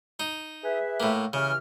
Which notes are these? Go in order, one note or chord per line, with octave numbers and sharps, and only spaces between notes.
D#4
G#4 B4 E5
A2 A#3
C#3 E3 G4 F6